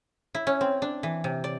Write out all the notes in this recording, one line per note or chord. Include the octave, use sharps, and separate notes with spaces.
E4
C#4
C4
D4
E3
C3
D5